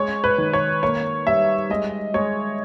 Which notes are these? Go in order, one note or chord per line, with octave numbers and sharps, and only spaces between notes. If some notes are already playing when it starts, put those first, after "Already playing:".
Already playing: G#3 C#5
B4
D#3
C#5
A#3 C#5
G3 E5
G#3 D#5
G#3 C#5